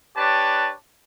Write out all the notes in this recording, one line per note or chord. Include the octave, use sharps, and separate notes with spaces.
D4 G4 B4 C#5 A5